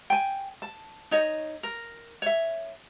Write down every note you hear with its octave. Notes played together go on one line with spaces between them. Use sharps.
G5 G#5
A5
D#4 C#5 D#5
A#4
C#5 E5